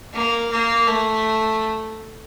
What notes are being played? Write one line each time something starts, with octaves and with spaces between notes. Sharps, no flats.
A#3
A#3
A3